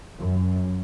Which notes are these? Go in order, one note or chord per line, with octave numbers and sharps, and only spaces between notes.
F#2